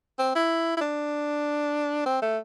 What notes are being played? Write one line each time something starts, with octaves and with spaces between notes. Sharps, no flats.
C4
E4
E4
D4
C4
A3